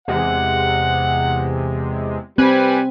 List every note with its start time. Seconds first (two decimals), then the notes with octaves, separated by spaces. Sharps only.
0.08 E2 C3 G#3 F#5
2.38 G3 C4 B4 G#5